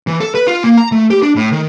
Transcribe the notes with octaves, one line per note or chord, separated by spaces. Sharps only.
E3
A4
B4
F4
A#3
A#5
A3
G4
D4
A2
D#3